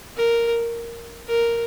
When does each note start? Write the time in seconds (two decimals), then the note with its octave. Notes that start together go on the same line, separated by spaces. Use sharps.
0.17 A#4
1.27 A#4